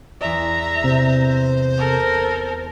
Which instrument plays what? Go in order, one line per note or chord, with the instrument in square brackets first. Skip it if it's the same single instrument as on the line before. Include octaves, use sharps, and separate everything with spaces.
[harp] E2 D5 [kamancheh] E5 A#5
[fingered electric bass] C3 [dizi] C5
[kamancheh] A4 A#4